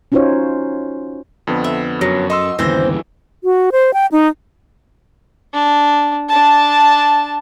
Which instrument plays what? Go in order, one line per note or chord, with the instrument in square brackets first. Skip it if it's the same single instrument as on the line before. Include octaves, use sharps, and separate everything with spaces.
[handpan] C#4 D#4 F4 F#4 C5 C#5
[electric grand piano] F2 D3 B3
[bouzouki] E5
[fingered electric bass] F#2 [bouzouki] F#3
[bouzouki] A4 [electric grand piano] D#5 C6 E6
[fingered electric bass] G1 D#2 C#3 [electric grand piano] E3 E6 A#6 [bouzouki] C4 C5
[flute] F#4
C5
G5
D#4
[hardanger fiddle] D4
D4 A5